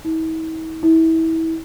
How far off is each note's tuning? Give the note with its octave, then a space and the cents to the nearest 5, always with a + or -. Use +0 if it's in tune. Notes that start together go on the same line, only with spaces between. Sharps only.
E4 -45
E4 -30